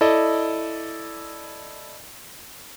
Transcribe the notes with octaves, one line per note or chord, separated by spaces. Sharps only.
E4 A4 D5 D#5